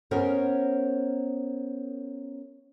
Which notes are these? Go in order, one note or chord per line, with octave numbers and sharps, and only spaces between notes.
B3 C#4 A#4 C5 C#5